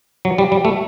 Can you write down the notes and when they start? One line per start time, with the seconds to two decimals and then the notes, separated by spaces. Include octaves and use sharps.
0.25 F#3
0.38 G3
0.52 G3
0.65 A3